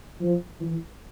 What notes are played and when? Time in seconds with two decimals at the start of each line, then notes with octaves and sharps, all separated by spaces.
0.21 F3
0.60 E3